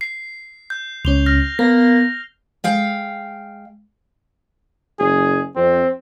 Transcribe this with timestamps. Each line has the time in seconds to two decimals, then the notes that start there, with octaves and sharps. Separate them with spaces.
0.01 C7
0.70 G6
1.05 C#2 C#4 F7 G7
1.26 F6 A#6
1.59 A#3 B3 A#6
2.64 G#3 F5 G5
4.99 F#1 G#4
5.56 F2 C4